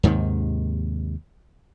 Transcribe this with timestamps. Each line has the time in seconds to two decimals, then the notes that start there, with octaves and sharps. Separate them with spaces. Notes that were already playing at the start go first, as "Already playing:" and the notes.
0.03 D#2 G#2 C3 D#3